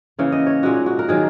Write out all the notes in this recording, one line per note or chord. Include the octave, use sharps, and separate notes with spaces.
C#3 E3 A#3 C#5
D#5
C#5
A#2 G#3 D#4 F#4
F#4
A#4
D#3 F#3 G#4